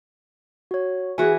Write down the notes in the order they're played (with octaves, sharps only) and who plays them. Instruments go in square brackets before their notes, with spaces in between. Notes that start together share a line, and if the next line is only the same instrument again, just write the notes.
[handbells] F#4 C#5
[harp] E3 F#4 [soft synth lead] G#4 [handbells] G#5